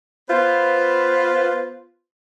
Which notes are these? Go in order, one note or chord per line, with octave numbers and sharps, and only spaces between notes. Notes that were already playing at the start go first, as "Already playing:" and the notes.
B3 F4 B4 C5